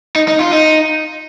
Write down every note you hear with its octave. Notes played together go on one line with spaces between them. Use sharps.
D#4
D#4
F4
D#4